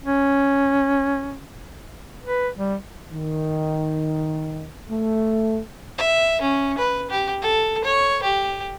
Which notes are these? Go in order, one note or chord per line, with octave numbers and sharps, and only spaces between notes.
C#4
B4
G3
D#3
A3
E5
C#4
B4
G4
A4
C#5
G4